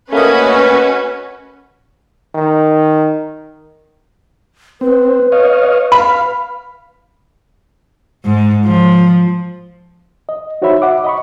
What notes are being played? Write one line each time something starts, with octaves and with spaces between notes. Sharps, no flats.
A3 A#3 C#4 F#4 B4 D#5
D#3
C4 B4
C#5 D#5 F5
F5 B5
G#2
F3
D#5
D#4 F#4 C5 C#5 E5 B5
E5 F#5 D6
D#5 B5 C#6